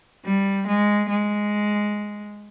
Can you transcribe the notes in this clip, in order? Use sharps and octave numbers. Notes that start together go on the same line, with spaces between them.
G3
G#3
G#3